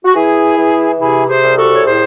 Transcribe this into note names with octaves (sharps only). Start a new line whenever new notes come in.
F#4
E3 E4 G#4
E3
C3 E4 G#4
G#4 C5
C2
F#4 A4
C#5
A2 G#4 C5